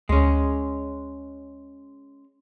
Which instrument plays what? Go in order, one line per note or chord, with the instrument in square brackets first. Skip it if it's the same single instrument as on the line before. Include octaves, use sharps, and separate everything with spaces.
[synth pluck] D2 [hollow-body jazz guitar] G#3 C#4